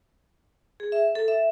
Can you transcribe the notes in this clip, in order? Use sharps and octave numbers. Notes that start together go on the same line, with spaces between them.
G#4
E5
A4
E5